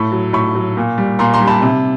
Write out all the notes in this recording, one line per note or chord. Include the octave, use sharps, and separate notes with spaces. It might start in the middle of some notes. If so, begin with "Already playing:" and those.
Already playing: A2 B5 C#6
F#3
A2 B5 C#6
F#3
A#2
G3
A#2 A#5 C6
A#5 C6
G3
A5 B5
C3